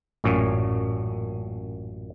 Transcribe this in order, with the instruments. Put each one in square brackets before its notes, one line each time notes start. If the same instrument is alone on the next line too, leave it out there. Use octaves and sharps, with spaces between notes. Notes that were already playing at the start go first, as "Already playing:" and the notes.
[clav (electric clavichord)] A1 F#2 A#2 C#4